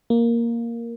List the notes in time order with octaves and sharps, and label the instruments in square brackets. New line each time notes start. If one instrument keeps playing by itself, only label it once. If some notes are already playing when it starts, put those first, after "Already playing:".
[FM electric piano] A#3